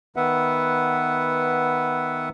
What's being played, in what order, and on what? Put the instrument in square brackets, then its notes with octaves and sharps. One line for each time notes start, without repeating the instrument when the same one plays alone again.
[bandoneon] D#3 B3 B4 E5 F#5